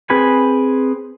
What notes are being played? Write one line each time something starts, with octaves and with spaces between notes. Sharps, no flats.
C4 G#4 B4 G#5 B5